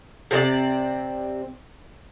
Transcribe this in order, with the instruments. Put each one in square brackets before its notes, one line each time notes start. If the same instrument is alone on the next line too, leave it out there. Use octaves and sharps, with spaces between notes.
[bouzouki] C3 C4 G4 D5